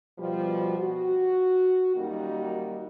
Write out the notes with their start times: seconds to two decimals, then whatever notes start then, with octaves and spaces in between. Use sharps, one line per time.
0.18 B2 F3 G3
0.78 F#4
1.96 F#2 D#3 G3 A#3 D#4 F#4